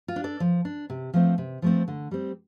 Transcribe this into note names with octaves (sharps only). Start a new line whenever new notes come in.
F4
D4
A4 D5
F3
D4
C3
F3 A3 C4
C3
F3 A3 C4
D3
G3 C4